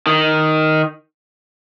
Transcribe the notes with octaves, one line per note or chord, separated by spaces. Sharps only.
D#3